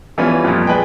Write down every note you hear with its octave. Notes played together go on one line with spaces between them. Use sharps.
E3 G3 B3 C#4 F4
F2 A#2
G#4 B4 D5 D#5 G5